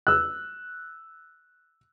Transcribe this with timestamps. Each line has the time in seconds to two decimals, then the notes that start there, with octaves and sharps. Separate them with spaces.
0.07 E6 F#6